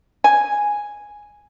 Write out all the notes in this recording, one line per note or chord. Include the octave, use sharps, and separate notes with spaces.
G#5